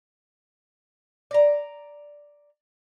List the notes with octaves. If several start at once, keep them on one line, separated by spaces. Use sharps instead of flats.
D5 A#5